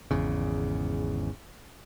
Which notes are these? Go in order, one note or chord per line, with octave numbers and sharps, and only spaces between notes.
G#1 E2 C#3